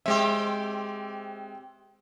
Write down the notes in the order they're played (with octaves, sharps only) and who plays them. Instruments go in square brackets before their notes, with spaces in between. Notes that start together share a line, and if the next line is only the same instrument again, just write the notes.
[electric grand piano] G#3 E5 [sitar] C4 G4